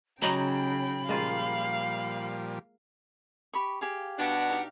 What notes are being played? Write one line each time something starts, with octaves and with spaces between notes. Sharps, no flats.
C#3 F#3 D#4 G4 G5 B5
A#2 F3 G3 G#3 A#3 F4 F5
G4 B5 C#6
G4 G#4 F5
B2 D4 F#5
D#4 G4 F5